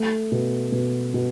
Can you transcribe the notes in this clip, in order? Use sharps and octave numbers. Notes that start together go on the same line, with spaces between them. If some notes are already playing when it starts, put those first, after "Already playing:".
Already playing: A3
B2
B2
B2